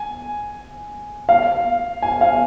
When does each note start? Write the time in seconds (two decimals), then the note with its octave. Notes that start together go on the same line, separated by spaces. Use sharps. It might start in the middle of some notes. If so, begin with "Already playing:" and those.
Already playing: G#5
1.29 F5
2.02 G#5
2.21 F5